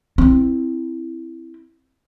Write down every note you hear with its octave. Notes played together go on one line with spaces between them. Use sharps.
C4 E4